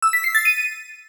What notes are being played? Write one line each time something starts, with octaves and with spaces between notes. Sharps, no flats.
E6
B6
C7
A6
D#7